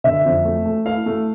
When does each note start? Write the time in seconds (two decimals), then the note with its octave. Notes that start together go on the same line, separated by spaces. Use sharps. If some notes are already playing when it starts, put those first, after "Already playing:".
0.04 D3 E5
0.25 F2
0.45 A3
0.65 A3
0.85 E4 F5
1.06 A3